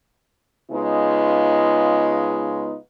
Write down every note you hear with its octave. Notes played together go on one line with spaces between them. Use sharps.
C#3 G#3 B3 D#4 F4